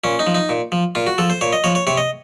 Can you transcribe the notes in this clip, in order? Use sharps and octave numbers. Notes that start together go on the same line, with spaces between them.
A#2 C#4
D#4
F3
D#4
A#2
F3
A#2 F4
F#4
F3 A4
C5
A#2 C#5
D#5
F3 C#5
C#5
C3 C#5
D#5